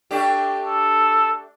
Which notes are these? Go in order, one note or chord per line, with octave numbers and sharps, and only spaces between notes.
A3 D4 G4
A4